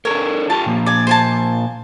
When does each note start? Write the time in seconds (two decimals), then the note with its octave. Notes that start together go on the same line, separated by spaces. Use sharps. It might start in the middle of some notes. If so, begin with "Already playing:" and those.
0.05 D4 A4 A#4 C#5
0.50 F4 G4 A5
0.66 A#2 F3 A#3
0.86 D5 G#5
1.07 C5 G#5 A5